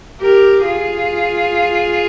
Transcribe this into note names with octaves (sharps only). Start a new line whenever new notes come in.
G4 A#4
F4 G#4